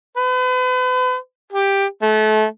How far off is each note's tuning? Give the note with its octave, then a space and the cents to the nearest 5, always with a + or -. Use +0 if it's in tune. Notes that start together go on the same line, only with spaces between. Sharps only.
B4 +40
G4 +10
A3 -30